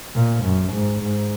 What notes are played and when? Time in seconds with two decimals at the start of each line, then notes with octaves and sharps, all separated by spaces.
0.15 A#2
0.44 F#2
0.72 G#2
1.00 G#2